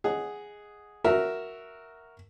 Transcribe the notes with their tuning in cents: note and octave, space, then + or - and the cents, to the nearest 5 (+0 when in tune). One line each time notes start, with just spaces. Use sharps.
G#4 +0 D#5 +0 F#5 +5
F#4 +0 A#4 +0 E5 +0